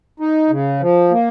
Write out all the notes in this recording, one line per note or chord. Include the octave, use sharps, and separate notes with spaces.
D#4
C#3
F3
A#3